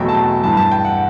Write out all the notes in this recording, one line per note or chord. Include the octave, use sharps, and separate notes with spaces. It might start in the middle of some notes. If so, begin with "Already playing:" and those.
Already playing: E2 B2 F#3 A3 G5
A5
G5
G2 E3 G3 A5
A5
G5
F#5